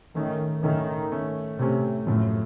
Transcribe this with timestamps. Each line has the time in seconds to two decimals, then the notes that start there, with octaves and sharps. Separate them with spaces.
0.15 A2 D#3 A3 C#4
0.63 A2 D#3 A3 C#4
1.12 A2 A3 C#4
1.59 A2 C3 A3 C#4
2.07 F#2 A2 F3 A3 C4